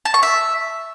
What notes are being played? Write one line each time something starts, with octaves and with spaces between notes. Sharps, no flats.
A5
C#6
E5